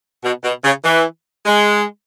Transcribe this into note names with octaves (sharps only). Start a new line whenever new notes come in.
B2
B2
C#3
E3
G#3